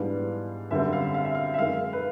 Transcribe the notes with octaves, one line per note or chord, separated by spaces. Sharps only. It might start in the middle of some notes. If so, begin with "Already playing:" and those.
Already playing: G#2 E3 G3 B3 D4 F5
F#2 D3 G3 C4 E5
F5
F5
E5
F5
E5
F#2 D#3 G#3 F5
B4